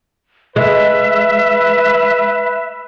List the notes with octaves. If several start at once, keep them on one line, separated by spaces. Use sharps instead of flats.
G#3 B4 E5